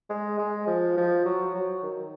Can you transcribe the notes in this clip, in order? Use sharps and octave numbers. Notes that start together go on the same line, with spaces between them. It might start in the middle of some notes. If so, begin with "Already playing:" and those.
G#3
G#3
F3
F3
F#3
F#3
D#3